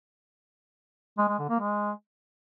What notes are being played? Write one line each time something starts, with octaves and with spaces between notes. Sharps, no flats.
G#3
G#3
D3
A#3
G#3